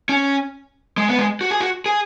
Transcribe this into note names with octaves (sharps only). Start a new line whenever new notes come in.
C#4
G#3
B3
G#3
F#4
G#4
F#4
G#4